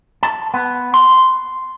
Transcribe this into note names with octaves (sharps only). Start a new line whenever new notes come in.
A5
B3
C6